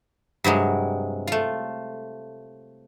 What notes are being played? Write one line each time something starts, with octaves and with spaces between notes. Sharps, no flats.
G2 C3 F#3 G#3
A3 F4